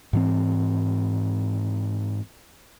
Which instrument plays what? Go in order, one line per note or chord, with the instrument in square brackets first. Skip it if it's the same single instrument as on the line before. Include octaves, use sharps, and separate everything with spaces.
[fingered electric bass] G#2 E3 C4